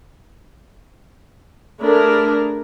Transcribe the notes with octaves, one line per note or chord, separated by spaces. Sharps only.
A3 D4 G#4 A#4 B4